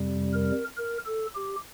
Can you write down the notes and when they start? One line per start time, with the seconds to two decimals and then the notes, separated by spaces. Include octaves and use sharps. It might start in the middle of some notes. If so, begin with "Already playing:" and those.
Already playing: F2 C3 G3
0.33 A#4
0.77 A#4
1.06 A4
1.36 G4